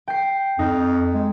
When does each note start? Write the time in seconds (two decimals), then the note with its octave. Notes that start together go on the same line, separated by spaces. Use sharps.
0.08 G5 C7
0.59 F2 D#4
1.15 G#3